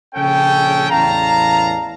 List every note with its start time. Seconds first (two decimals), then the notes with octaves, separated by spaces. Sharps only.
0.15 A#1 C#3 C#4 A4 G5
0.90 A1 E2 F5 A5 A#5